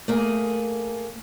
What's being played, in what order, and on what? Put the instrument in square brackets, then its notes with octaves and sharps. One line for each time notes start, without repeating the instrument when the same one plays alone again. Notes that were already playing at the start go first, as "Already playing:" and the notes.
[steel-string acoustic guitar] A3 A#3 G#4